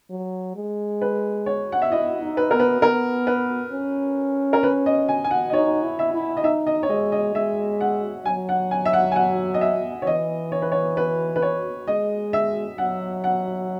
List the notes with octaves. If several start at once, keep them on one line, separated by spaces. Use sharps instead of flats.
F#3
G#3
B4
C#5
F#5
E5
E4 D#5
D#4
B4
B3 A#4
B4
B3 A#4
B4
C#4
A#4
B4
D#5
G#5
G#5
F#5
D#5
D#4 C#5
E4
E5
E4
D#5
D#4 E5
D#5
C#5
G#3 D#5
D#5
G#3 E5
F#5
F#3 G#5
F#5
G#5
E5
F#5
G#5
F#5
D#5
E5
C#5
E3 D#5
C#5
B4
C#5
B4
B4
C#5
G#3 D#5
E5
F#3 F#5
F#5